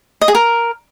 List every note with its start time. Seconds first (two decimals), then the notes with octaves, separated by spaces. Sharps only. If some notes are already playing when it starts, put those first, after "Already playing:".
0.21 D#5
0.28 G#4
0.35 A#4